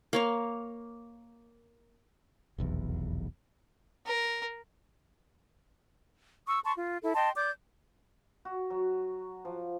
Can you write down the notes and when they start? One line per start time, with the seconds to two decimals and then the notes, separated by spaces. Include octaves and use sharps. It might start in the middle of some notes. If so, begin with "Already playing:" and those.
0.13 A#3 C#5 F5
2.58 F1 B1 E2
4.06 A#4
6.46 C#6 D#6 E6
6.64 A5 C6 C#6
6.77 F4
7.02 E4 A4
7.14 D#5 G5 A5 C6
7.36 D5 D6 G6
8.45 F#4
8.70 F#3
9.45 F3